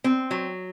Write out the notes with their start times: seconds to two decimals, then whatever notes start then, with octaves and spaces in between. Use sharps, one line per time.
0.04 C4
0.31 F#3